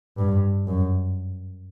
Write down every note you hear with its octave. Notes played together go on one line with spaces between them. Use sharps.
G2
F#2